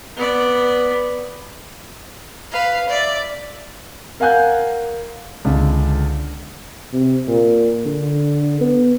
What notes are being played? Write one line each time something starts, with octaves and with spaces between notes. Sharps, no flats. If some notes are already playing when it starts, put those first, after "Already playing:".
B3 D5
B4 F5
D5 E5
A#4 F5 F#5 G#5 F#6 G6
C#2 D3
C3
A#2
D3
B3